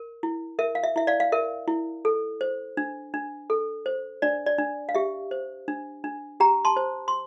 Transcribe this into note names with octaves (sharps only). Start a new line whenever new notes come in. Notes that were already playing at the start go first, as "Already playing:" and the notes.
Already playing: A#4
E4
A#4 E5
F5
E5
E4 E5
D5 F5
F5
A#4 E5
E4
A4
C5
D4
D4
A4
C5
D4 D5
D5
D4
F5
G4 E5
C5
D4
D4
G4 G5 A#5
A5 C6
C5
C6